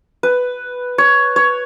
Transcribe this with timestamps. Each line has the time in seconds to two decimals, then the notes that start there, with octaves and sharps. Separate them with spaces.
0.23 B4
0.98 C#5
1.36 C#5